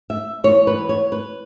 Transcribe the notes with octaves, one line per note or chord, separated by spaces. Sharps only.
E5
E3 G#3 B3 C#5
B4
C#5
B4